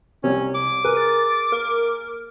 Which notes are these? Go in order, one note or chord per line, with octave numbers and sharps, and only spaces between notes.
C2 C3 C#4
D6
G#4 A#4 B4
A6
A#3 A#4